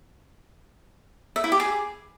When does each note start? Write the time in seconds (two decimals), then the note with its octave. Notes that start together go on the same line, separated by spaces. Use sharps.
1.36 E5
1.44 E4
1.52 G4
1.60 G#4